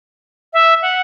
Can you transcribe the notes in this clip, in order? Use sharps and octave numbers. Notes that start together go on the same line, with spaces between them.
E5
F#5